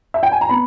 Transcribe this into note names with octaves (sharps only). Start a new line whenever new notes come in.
E5
G5
G#5
A#5
B3 B5